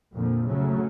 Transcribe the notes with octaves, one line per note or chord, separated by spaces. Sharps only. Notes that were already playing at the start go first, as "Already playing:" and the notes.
F2 A#2 D3 F3
C#3 F#3 A3